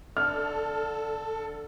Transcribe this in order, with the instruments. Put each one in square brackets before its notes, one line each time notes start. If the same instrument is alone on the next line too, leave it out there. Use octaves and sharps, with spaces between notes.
[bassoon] D3 [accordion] A4 [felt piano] F6